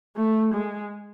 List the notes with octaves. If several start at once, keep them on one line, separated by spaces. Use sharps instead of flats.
A3
G#3